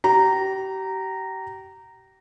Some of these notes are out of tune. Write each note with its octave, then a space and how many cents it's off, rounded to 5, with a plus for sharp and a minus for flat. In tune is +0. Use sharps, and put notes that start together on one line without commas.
G4 -35 A#5 -10